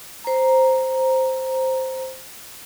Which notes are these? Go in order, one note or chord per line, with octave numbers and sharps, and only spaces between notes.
C5 A#5